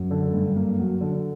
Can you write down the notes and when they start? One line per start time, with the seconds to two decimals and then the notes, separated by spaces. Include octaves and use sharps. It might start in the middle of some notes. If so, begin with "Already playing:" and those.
Already playing: F#2 F#3
0.11 D3
0.33 G2
0.56 A#3
0.79 F#3
1.01 D3